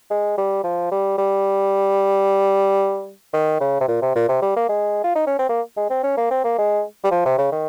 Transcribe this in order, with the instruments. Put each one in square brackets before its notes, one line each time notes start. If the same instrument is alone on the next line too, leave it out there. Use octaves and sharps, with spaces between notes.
[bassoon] G#3
G3
F3
G3
G3
D#3
C#3
C3
A#2
C3
A#2
C3
G3
A#3
G#3
F4
D#4
C#4
C4
A#3
G#3
C4
C#4
A#3
C4
A#3
G#3
G3
F3
C3
C#3
D#3